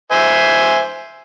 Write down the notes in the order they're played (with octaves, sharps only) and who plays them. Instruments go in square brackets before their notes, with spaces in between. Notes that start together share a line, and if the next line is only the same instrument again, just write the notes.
[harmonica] C5 E5 G#5